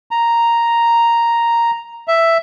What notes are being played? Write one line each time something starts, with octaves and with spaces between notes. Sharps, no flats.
A#5
E5